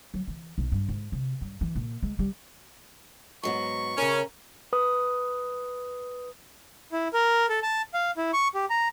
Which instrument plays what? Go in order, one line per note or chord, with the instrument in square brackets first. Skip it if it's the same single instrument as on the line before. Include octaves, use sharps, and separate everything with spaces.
[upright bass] F#3
E3
B1
G2
G#2
C3
G2
E3
A#2
G#3
G3
[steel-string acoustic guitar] G#2 F#3 B3 [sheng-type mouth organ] C#6
[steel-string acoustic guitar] C#3 A#4 [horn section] C#4
[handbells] B4 D#6
[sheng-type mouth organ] E4
A#4
A4
A5
F5
E4
C#6
G4
A#5